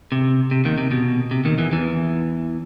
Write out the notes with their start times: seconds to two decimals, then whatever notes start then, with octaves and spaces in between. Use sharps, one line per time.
0.12 C3
0.51 C3
0.65 D#2 D#3
0.78 C3
0.91 B2
1.31 C3
1.45 D#2 D#3
1.58 E2 E3
1.73 E2 E3